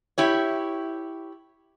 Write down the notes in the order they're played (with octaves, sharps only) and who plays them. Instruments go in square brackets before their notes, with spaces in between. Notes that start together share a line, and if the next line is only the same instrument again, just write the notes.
[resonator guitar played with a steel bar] E4 G4 C#5